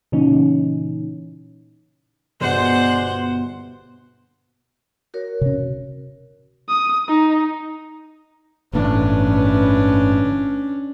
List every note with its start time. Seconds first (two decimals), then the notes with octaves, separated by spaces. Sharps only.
0.12 A#2 C#3 E3 C#4 D#4
2.41 G1 B2 G#3 C5 D5 F#5 C6
5.14 F#4 A#4 C#5
5.41 C3 C#4
6.68 D#6
7.08 D#4
8.73 G1 A2 E3 C#4 D4 B4